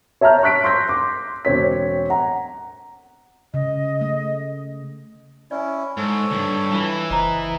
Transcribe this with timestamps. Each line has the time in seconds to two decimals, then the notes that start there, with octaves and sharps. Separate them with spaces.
0.21 C#5 E5 A5 A#5 F6 G6
0.43 C#6 F#6 B6 D7
0.64 C6 C#6 E6 G6 A#6 B6
0.89 C6 D6
1.45 E1 C4 C#5 B6
2.10 F#5 A#5
3.54 C#3 D#5
4.01 A3
5.51 C#4 E4 D5 G#5
5.97 G#2 A4 C#5
6.31 D2 G2
6.71 E3 F4 B4 B5
7.10 F#1 B4 C5 D#5 A#5